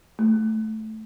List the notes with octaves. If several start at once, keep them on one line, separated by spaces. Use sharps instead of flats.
A3